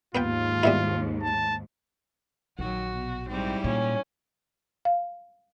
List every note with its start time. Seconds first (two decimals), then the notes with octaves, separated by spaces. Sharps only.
0.15 D#2 G#2 B3 F4 B4 G5
0.63 G3 B3 E4
1.22 A5
2.59 A#1 D#3 F#3 F#4
2.90 B2
3.29 G#2 G3 C4 E4
3.64 A#2 C#4
4.85 F5